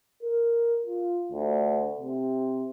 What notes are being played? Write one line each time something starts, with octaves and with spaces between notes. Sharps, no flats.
A#4
F4
D2
C3